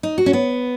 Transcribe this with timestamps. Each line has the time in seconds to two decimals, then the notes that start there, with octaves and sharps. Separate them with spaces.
0.03 D#4
0.18 F#4
0.26 C#4
0.33 B3